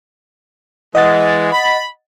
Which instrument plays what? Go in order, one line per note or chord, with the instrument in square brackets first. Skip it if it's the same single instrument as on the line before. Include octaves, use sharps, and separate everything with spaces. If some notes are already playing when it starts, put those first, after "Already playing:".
[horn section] E3 G#3 [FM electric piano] D#5 F#5 A6
[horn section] B5